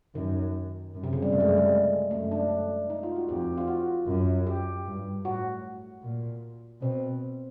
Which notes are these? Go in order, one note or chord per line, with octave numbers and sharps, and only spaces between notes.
F#2 D#3
F#2
C3
C#3
G3
F#2 A3
G#3
G3
G#3
F#2 A3
D4
D#4
F4
F#4
F2 G4
F4
F#4
F#2
G4
G2
A2 F#4
A#2
B2 C4